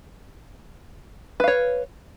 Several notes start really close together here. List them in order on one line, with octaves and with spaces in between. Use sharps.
B4 F5 C#5